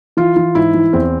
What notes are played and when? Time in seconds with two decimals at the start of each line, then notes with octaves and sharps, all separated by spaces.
0.17 E3 F4
0.36 E3
0.55 G#2 E4
0.74 E3
0.93 E2 C4